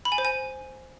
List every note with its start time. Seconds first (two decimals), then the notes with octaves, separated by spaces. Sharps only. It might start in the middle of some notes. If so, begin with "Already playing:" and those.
0.05 B5
0.12 G#5
0.18 C5
0.25 G#5